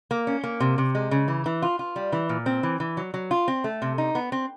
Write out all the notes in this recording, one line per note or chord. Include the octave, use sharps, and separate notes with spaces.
A#3
C#4
A#3
C3
C3
G#3
C#3
E3
E3
F4
F4
G3
E3
A#2
C4
E3
E3
F#3
F#3
F4
C4
A3
C3
D#4
B3
C4